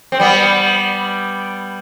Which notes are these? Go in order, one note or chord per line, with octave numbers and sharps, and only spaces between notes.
C4
G3 B3